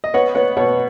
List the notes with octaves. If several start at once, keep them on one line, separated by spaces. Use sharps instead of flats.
D#5
B3 C#5 F#5
B3 C#5 F#5
B2 C#5 F#5